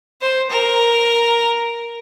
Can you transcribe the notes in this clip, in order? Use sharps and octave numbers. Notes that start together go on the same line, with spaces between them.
C5
A#4